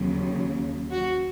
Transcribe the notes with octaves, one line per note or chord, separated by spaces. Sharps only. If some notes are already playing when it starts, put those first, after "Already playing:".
Already playing: D#2 C#3 F#3
F#4